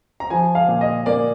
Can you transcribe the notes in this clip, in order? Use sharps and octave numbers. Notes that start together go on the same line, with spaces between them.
A#5
F3 G#5
F5
A#2
D#5
A#3 D5